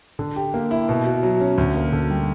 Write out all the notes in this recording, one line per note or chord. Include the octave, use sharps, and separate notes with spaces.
D3
G4
A#3
E4
B2
F#4
F#3
C#4
D2
A#3
D3
G3